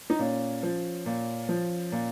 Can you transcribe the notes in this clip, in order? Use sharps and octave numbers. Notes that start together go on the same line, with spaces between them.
D#4
A#2 C#4
F3
A#2
F3
A#2